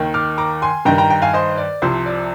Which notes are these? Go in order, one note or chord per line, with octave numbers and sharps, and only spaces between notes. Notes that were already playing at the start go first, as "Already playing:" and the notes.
Already playing: D#2 D#3
D6 F6
A#5 D6
G#5 C6
G2 D#3 G5 A#5
G5 A#5
G5 A#5
F5 G#5
C5 D#5
D5
C2 C3 F3 C5
D5